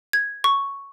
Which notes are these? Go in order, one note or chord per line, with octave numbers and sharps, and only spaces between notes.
G#6
C#6